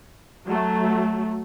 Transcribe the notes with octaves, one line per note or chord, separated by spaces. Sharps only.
F#3 A3